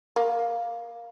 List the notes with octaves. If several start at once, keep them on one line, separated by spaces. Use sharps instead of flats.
A#3